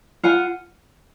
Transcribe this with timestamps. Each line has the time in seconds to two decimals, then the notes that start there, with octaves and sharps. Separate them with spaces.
0.23 F4 F#5 G#5